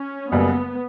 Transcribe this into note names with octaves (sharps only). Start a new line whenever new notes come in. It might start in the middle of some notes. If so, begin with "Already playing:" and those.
Already playing: C#4
F#1 F#2 C#3 G3 B3